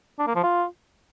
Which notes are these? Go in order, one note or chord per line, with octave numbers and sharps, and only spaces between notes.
D4
A#3
F3
F4